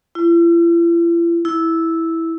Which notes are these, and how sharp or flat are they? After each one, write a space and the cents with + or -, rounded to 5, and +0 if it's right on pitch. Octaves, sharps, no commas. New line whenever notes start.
E4 +45
E4 -5